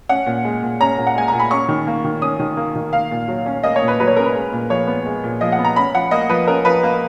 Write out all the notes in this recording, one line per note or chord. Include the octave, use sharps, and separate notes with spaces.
C#4 F#5
A#2
G#3
A#2
C#4 A#5
A#2
F#5
G#3 G#5
A#2 A#5
B5
C#4 C#6
D#3
A#3
D#3
C#4 D#6
D#3
A#3
D#3
A#3 F5
A#2
F#3
C#4
A#3 D#5
C#5
A#2
B4
F#3 B4
C#5
C#4 A#4
B4
G#3
A#2
F3 C#5
B3
G#3
A#2
F3 D#5
F#5
B3
A#5
C#4 B5
F3 F#5
A#3 D#5
F3 B4
C#4 A#4
F3 B4
A#3